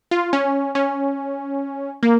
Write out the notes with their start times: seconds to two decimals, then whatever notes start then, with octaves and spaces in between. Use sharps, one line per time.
0.11 F4
0.33 C#4
0.75 C#4
2.03 A#3